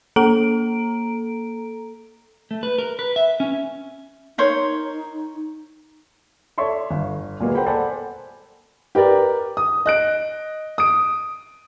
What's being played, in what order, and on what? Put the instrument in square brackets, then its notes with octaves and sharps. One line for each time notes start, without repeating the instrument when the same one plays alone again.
[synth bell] A#3 A4 A#5 D7
[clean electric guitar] A3
B4
A#4
B4
E5
C#4
[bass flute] D#4 [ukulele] A#4 C5 C#5
[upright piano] A4 C#5 D5 E5 C6 C#6
G1
A#2 F#3 G#3 A#3 B3
A#4 C5 F#5 G5 B5
A4 C5 D5 F#5 G#5 B5
G4 A#4 B4 D5
D#6
D#5 F#6 D7
D#6 D7